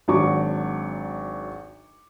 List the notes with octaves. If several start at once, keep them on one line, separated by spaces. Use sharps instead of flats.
G#1 F#3 D4 C#6 D6